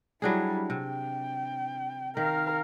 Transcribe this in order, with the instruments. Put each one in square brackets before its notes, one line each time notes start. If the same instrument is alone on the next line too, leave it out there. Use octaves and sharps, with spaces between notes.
[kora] F#3 D4 G#4 [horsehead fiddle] G3 E4
[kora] C3 [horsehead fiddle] G5
[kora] D#3 [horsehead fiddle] A#4 F5